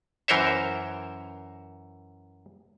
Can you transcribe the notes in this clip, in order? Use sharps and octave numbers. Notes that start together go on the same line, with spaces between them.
F#2 E3 A#4 C5 C#5 E5